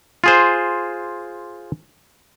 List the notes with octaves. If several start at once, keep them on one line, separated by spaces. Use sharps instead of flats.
F4 G#4 C5